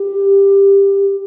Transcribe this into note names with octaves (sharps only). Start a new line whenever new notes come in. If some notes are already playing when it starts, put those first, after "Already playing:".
Already playing: G4